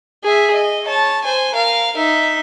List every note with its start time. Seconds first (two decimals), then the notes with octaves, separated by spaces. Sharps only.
0.24 G#4 E5
0.53 D#5
0.85 C#5 A5
1.24 C5 G#5
1.54 A#4 F5
1.97 D#4 E5